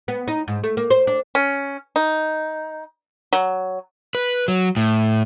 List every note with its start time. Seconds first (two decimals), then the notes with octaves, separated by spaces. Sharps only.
0.08 B3
0.28 D#4
0.48 G#2
0.64 A3
0.77 A#3
0.90 C5
1.07 D4
1.35 C#4
1.96 D#4
3.33 F#3
4.15 B4
4.48 F#3
4.77 A2